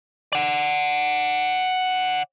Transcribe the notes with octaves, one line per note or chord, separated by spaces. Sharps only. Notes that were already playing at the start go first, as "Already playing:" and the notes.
D5 F#5